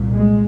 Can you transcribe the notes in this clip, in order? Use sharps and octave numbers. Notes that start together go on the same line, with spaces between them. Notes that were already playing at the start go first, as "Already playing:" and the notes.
Already playing: C2 A#2
G#3